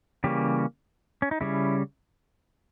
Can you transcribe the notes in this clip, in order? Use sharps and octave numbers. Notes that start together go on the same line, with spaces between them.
C#3 E3 G3 A#3 C#4 G4
C#4
D#4
C#3 G3 C#4 E4